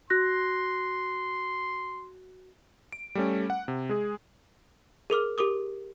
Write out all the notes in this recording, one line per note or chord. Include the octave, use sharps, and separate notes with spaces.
F#4 C6 F#6 A#6
D7
G3 A3 C#4
F#5
C3
G#3 G#4
G#4 A#4 D6 F6
G4 A#4 D6 D#6